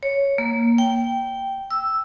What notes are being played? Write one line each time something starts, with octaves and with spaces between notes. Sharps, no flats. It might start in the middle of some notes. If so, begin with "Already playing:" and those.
C#5
A#3
G5
E6